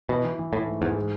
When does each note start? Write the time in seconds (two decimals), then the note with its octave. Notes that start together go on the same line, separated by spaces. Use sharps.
0.09 B2 E3
0.24 E3
0.39 E3
0.52 A2 A3
0.67 G#2
0.81 E2 G#2
0.96 G#3